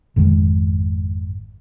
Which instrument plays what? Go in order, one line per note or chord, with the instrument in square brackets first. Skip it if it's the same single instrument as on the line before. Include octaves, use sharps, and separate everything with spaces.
[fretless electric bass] G#1 F2 D#3 G#3